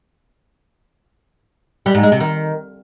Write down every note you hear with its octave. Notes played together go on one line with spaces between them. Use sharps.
G3
G#2
G#3
C3
D#3